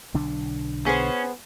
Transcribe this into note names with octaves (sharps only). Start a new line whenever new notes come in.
B1 D3 D4
B3 C#4 G#4 C5